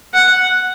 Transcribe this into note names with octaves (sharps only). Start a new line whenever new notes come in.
F#5